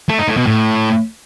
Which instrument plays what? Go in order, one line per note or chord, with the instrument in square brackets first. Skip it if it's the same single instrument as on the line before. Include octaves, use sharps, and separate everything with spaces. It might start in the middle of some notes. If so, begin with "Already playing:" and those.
[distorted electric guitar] A3
D#4
A2
B2
A2